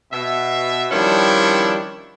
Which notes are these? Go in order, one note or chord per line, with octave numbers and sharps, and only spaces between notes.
B2 E5
D#3 F3 G3 C#4 D4 E4